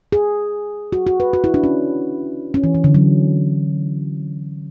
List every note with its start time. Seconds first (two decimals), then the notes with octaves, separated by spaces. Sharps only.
0.12 G#4
0.92 F#4
1.07 F#4
1.20 B4
1.33 F#4
1.44 E4
1.54 D4
1.64 C#4
2.54 C#4
2.64 E3
2.75 E3
2.84 D3
2.94 F#3